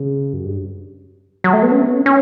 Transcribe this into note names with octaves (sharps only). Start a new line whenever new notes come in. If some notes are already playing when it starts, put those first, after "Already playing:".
Already playing: C#3
F#2
G2
F#3
A3
B3
C#4
B3
C#4
C#4